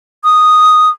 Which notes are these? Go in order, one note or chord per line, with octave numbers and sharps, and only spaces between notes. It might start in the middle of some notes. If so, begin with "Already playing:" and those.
D#6